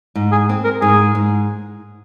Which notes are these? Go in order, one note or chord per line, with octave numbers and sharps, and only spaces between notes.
G#2
G#4
C4
A#4
G#2 G#4
G#2